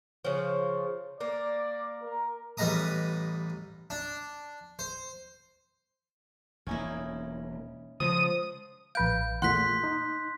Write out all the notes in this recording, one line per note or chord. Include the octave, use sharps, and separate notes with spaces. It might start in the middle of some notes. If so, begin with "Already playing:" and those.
C#3 F3
A#3 D5
A#4
A1 G3 B4 D#5 A#5 D#6
D4
C5
E1 A#3 C#4 D#4 E4
C#3 F3 G#3 D#6
A#1 B4 F5 G6 D7
E2 A#2 A3 F#5 C6 F#6 B6
D#4